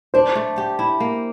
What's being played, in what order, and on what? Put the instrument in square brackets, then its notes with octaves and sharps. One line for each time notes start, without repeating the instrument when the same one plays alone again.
[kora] D4 [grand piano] C5
[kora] A3
G4
E4
A#3